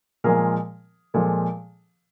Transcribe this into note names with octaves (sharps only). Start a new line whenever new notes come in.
A#2 F3 G#3 G#4 A#4
A#2 F3 G#3 A4